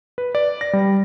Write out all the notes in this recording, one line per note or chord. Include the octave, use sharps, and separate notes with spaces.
B4
D5
A#6
G3